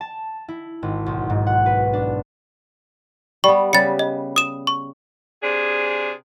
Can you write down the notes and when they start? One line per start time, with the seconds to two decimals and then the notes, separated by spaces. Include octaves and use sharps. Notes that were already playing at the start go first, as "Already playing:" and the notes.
0.01 A5
0.49 E4
0.83 G#1
1.06 B1
1.30 G#2
1.47 F#5
1.66 B4
1.93 D4
3.44 G3 B3 C#6
3.73 C#3 G3 B4 A6 C#7
3.99 D#5
4.36 D#6 E7
4.67 C#6
5.43 C3 D4 G#4